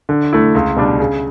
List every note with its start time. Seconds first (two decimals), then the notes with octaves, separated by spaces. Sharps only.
0.09 D3
0.33 A3 E4
0.55 C#2
0.77 B2 G3 D4
1.00 C#3